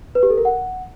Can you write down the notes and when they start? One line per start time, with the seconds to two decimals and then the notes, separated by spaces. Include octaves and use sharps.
0.15 B4
0.23 G4
0.30 A4
0.38 A#4
0.45 F#5